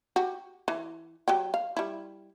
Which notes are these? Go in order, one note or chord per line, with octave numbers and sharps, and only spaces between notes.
F#4 G4
E3
F#3 G4 G5
F5
G3 E4